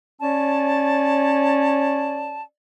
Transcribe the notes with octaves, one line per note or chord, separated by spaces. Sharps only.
C#4 C#5 D5 A5